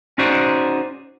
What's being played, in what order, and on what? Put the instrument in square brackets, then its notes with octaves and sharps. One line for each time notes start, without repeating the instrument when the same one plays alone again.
[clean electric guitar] C#4 D#4 F#4 G#4 C5 D5